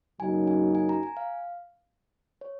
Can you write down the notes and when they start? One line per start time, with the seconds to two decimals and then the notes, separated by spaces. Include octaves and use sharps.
0.20 F#2 C#3 F#3 A#3 D#4 G#5
0.47 G#5
0.75 G#5
0.89 A#5
1.03 G#5
1.17 F5
2.41 C#5